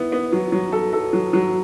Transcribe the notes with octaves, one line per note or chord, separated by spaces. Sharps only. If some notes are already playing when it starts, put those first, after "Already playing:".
Already playing: B3 E4
B3
F#3
F#3
A4
A4
F#3
F#3